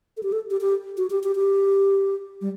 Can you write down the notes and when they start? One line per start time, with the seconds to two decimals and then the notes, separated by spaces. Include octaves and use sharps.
0.17 A4
0.23 G4
0.32 A4
0.50 G4
0.61 G4
0.97 F#4
1.10 G4
1.24 G4
1.36 G4
2.41 G3